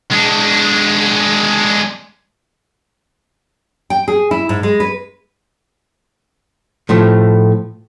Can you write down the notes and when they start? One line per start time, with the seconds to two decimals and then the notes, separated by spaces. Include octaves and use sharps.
0.11 G#3 D4
3.90 G5
4.08 G#4
4.31 E4
4.49 G#2
4.63 G#3
4.80 B4
6.89 A2 F3 A3